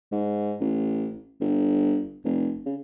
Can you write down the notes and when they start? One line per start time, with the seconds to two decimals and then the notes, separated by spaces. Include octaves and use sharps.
0.12 G#2
0.60 A1
1.40 G1
2.25 F1
2.66 C#3